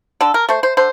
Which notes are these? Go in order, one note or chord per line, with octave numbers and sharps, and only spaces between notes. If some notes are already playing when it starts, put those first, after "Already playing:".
D3 A4
A#4
A3 C5
C5
D3 C5